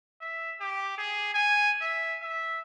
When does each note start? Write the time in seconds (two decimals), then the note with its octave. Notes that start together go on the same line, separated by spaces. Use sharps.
0.21 E5
0.61 G4
0.98 G#4
1.34 G#5
1.81 E5
2.21 E5